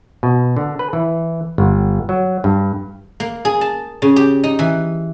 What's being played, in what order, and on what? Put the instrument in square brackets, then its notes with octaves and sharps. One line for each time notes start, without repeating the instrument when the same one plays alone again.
[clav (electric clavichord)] B2
D3
B4
E3
G1
F#3
G2
[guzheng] A#3
G#4
A5
C#3
G4
D#4
E3